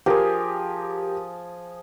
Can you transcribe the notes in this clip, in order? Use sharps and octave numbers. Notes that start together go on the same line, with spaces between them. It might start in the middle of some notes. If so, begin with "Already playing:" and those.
F3 G4 G#4 A#4